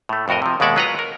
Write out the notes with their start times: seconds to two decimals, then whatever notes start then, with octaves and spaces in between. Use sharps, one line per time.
0.09 A2 A3
0.28 F2 A2 F#4 A#4 D#5
0.42 C3 F3
0.60 D#2 B2 G#3 D5 E5 F#5
0.76 F#3 F4 B4 D#5 F#5 A#5
0.99 A#4